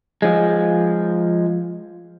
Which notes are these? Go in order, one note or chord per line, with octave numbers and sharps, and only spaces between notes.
F3 G#3